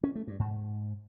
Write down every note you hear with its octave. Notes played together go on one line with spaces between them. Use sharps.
C#4
A3
G2
G#2